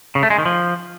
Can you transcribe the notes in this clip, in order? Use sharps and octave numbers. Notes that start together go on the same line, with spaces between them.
C#3
A3
G#3
D#3
F3